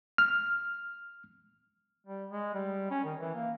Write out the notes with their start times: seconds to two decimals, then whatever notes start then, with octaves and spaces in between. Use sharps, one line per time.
0.18 F6
2.06 G3
2.30 G#3
2.55 G3
2.91 C#4
3.04 D#3
3.19 E3
3.35 A#3